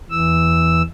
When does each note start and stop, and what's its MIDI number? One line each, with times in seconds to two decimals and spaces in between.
0.10 0.82 40
0.10 0.82 52
0.10 0.82 88